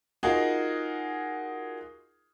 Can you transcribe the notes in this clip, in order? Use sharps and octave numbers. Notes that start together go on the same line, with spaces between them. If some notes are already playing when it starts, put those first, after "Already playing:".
D#4 F4 F#4 G#4 A#4